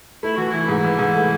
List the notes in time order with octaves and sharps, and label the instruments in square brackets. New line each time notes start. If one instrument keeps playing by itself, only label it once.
[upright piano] A3 [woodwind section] E4
[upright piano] E3 [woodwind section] F#4
[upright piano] E3 [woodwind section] E4
[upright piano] G#2
E3
G#2
A3